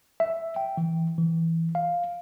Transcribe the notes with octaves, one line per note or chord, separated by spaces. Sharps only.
E5
G5
E3
E3
F5